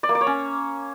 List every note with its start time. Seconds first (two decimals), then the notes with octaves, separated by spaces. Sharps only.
0.03 D5
0.09 A#3
0.15 D5
0.21 C#5
0.27 C#4